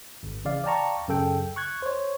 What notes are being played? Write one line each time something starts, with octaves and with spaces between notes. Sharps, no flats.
G#1
C#3 E3 D5 F5
D5 F5 G5 A5 A#5 C#6
F#2 C#3 A4 G5
C#6 F#6 G#6
C5 C#5